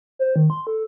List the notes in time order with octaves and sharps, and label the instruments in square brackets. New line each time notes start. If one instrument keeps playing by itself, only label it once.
[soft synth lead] C5
D#3
C6
A4